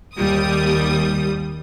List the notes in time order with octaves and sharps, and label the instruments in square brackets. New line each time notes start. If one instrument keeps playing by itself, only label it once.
[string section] D#2 G3 D#6